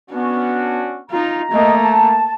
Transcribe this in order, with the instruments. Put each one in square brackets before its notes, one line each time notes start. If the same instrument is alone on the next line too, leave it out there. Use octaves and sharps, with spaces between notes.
[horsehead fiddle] B3 [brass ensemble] C#4 D4 F#4
[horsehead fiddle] D#4 F4 [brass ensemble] A#5
[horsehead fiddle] A3 A#3 [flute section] D#5
[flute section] A5